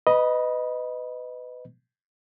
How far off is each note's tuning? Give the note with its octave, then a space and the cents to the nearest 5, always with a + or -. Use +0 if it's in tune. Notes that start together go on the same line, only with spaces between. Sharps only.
B4 +20 D#5 +0 B5 -20